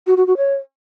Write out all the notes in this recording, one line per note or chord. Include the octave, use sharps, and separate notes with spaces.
F#4
F#4
F#4
C#5